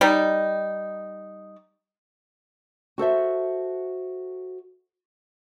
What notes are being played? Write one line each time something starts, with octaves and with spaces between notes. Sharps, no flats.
G3 D#4
F#4 A4 C5 E5